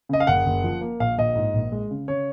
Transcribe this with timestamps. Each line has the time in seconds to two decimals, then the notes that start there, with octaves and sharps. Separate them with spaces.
0.09 C#3 D#5
0.20 F5
0.27 F#1 F#5
0.46 F#1
0.64 F3
0.81 A#3
1.00 A#1 F5
1.18 A#1 D#5
1.35 G#2
1.53 A#1
1.72 G#3
1.91 C#3
2.08 C#3 C#5